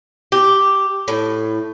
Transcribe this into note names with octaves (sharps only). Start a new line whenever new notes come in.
G4
A2